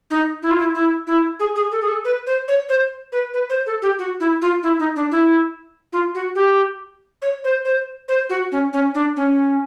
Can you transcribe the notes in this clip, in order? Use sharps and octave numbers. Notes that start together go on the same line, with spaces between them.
D#4
E4
F4
E4
E4
E4
G#4
G#4
A4
G#4
A4
B4
C5
C#5
C5
B4
B4
C5
A4
G4
F#4
E4
F4
E4
D#4
D4
E4
F4
F#4
G4
C#5
C5
C5
C5
F#4
C#4
C#4
D4
C#4